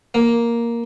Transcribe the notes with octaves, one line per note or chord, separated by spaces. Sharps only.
A#3